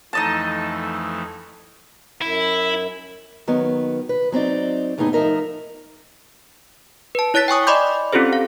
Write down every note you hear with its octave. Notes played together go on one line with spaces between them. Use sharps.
F2 E3 A3 D#4 D#5 A5
F#2 E4
D#3 F#3 B3
B4
F#3 C4 D#4 D5
D#2 A2 B3 D#4 G#4
F3 A3 D#4 A#4 E5
B4 A5
E4 C#5 F#6 A6 B6
G5 G#5 C#6 D#6
D5 D#5 B5 C6 D6 G6
C4 C#4 F4 G4 A4 C5
F5